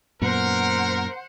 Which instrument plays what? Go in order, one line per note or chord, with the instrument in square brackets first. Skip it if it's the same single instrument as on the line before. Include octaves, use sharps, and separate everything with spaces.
[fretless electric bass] F#2 A#2 B3 [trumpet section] A#4 [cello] C5 F#5